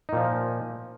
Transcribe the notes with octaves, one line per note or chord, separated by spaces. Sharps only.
A#2 F3 D#4